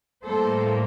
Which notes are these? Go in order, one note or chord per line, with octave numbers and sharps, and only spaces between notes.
A2 G3 A#3 A4 C5